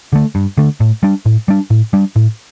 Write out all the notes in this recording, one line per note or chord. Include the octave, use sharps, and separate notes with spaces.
D3 A3
G2
D3 A3
A2
G3 D4
A2
G3 D4
A2
G3 D4
A2